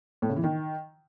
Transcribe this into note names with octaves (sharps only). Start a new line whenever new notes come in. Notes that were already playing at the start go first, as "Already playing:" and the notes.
A2
C#3
E3
D#3